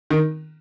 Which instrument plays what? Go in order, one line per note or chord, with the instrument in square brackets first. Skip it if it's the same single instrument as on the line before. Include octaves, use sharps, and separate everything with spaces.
[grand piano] D#3